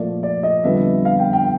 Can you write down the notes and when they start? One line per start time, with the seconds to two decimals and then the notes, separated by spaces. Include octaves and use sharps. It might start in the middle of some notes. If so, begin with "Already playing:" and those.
Already playing: A#2 F3 A3 D5
0.23 D5
0.43 D#5
0.64 F2 D3 G3 B3 E5
1.05 F5
1.19 G5
1.33 G5